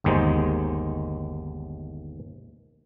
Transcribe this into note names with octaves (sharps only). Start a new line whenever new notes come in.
G1 D#2 D#3 G#3 D#4 C5